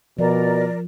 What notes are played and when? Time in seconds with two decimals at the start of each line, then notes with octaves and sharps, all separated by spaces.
0.19 B2 F3 A#4 D5